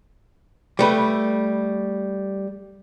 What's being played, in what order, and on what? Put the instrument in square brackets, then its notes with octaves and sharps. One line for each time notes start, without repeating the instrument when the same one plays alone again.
[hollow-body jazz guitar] G3 A3 B4